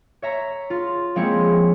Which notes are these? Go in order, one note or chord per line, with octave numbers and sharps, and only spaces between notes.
C#5 E5 A#5
F4
F3 G#3 A#3 C4 E4 C#5